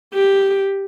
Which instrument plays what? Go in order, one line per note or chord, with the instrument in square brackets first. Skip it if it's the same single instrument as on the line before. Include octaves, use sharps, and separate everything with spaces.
[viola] G4